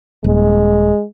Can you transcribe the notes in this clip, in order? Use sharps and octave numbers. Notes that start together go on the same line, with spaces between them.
D#1 G#3